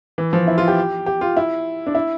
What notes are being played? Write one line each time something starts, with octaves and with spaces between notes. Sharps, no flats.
E3
F3
E4
F4
G4
G4
F4
E4
D4
E4